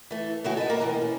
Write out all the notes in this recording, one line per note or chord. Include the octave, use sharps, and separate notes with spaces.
E3 A3
C#3 E3 A3 E4 F#4
A4 B4 D5 D#5
A#3 A#4
B2 D#3 E3
C#4